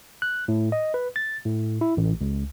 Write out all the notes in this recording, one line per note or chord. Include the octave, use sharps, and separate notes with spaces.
F#6
A2
D#5
B4
A6
A2
E4
A1
C#2